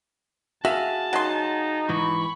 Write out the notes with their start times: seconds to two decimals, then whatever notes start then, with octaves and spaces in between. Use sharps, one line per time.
0.65 F#4 G#4 E5 F5 A5
1.13 F#3 D#4 C6
1.89 G#2 E3 B5 C#6